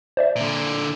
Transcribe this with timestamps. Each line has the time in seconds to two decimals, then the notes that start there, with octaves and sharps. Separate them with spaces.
0.17 C5 D5 E5
0.36 A#2 D3